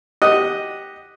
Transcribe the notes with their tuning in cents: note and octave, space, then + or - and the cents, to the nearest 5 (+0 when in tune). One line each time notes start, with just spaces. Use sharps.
G4 +0 D#5 +0 F#5 +0